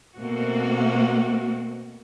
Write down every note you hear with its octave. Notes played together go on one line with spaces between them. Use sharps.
B2 A3 A#3 C4 F#4